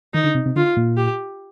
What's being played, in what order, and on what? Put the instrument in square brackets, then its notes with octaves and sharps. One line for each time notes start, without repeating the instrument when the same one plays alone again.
[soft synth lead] D#3 [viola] D#4
[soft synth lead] D3
C3
C3
[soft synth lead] D3 [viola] F4
[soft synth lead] A#2
[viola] G4